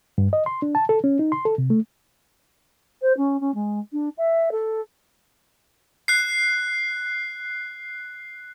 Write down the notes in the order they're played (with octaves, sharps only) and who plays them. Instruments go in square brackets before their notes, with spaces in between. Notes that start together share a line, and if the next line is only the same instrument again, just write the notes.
[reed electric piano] G2
D#5
C6
D4
A5
A4
C#4
D#4
C6
A4
C3
A3
[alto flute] C5
C#4
C#4
G#3
D4
E5
A4
[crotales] F#6 C7